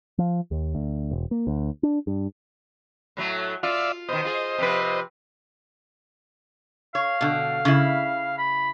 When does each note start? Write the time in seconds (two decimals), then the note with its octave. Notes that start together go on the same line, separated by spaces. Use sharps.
0.18 F3
0.51 D#2
0.75 D2
1.11 E1
1.31 A#3
1.47 D2
1.83 D4
2.07 G2
3.17 A2 F#3 A3
3.63 F4 D5 E5 F5
4.09 B2 D#3 C5 D#5
4.25 F4 G#4
4.58 C3 F3 B4
6.95 C#5 F5
7.21 B2 D3
7.65 C#3 E4
8.38 B5